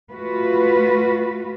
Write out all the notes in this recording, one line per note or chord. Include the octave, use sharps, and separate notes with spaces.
A3 F4 F#4 B4